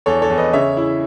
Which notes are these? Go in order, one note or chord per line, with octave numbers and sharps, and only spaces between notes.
E2 A4 C#5
A4 C#5
E2
B4 D#5
C#3 C#5 E5
E4